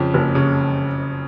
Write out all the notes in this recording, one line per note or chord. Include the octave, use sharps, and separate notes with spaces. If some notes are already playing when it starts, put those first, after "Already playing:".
Already playing: F2 C#3
F#1
C#3